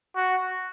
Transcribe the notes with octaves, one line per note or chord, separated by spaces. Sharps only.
F#4